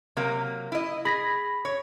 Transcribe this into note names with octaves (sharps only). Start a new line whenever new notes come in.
C3 F#3 A#3
E4 D#5
G#4 B5 A#6 B6
C#5